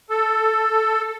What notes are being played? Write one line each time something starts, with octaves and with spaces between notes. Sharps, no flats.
A4